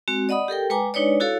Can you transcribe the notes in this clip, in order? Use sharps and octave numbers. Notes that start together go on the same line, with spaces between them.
G#3 C4 F#4
D5 D#5 F#5 B5 D#6
G4 A4 A#4 G5
G#3 B4 G5 G#5 A#5 D6
G#3 D4 D#4 B4 C#5 D5
E4 F#4 A4 C#5 F5